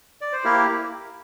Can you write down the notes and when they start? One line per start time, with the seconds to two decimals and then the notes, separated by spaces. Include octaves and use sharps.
0.21 D5
0.33 C5
0.44 A#3 E4 G4 A#4